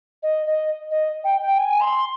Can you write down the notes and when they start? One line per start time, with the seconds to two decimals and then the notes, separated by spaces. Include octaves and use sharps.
0.22 D#5
0.46 D#5
0.91 D#5
1.24 G5
1.41 G5
1.58 G#5
1.80 C6